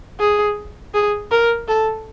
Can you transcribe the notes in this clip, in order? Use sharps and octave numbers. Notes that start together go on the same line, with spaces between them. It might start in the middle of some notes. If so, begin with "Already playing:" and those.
G#4
G#4
A#4
A4